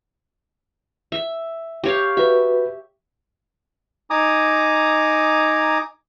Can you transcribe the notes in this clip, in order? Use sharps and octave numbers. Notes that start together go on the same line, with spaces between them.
E5
G4 C#5 F5
F#4 B4 E5
D#4 G#5 A#5 D6 D#6